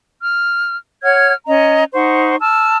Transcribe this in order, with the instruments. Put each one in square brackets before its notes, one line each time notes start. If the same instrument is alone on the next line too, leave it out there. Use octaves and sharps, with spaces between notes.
[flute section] F6
C#5 F#5 F6 G#6
C#4 D#5 A#5
D#4 C5 F#5 C#6
A5 E6 F6